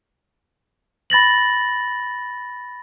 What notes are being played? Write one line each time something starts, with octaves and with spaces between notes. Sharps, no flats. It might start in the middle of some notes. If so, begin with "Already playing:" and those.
B5 A6 A#6 F#7